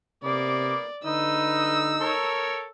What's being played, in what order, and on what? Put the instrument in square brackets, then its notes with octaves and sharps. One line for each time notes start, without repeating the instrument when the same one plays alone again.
[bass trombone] C3 [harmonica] A#3 B3 D6 [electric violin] D5
[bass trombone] D3 [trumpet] D#4 [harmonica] B4 D#5 [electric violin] E6
[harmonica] A4 A#4 C#5